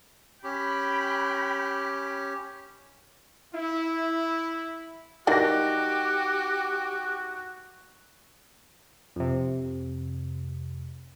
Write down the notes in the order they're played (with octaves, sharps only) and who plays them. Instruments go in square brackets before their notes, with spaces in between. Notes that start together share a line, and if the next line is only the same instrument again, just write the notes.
[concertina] C#4 G4 [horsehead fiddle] G5 B5
[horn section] E4
[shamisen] E3 F#3 G3 [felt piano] D#4 A#4 A#6 [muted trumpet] F#4 [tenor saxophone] G4
[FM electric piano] F2 C3